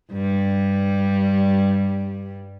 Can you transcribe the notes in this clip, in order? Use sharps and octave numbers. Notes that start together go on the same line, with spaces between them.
G2 G3